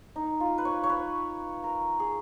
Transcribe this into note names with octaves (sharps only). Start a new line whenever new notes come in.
D#4
F4
B4
C#5
C#5
B4
A#4
G#4